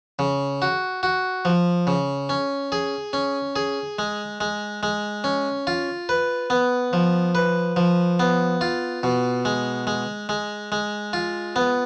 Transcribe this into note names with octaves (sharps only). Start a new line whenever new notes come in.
C#3
F#4
F#4
F3
C#3
C#4
G#4
C#4
G#4
G#3
G#3
G#3
C#4
F4
B4
B3
F3
B4
F3
B3
F4
B2
G#3
G#3
G#3
G#3
F4
B3